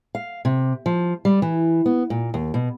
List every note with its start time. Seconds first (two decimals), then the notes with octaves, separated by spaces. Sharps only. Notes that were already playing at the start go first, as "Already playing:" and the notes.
0.15 F5
0.45 C3
0.86 F3
1.25 G3
1.42 E3
1.86 B3
2.10 A#2
2.34 D#2
2.54 B2